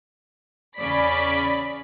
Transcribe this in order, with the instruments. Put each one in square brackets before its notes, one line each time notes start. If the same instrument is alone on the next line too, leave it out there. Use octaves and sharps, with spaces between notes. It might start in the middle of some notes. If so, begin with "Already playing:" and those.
[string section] E2 C#3 C#4 D5 B5 B6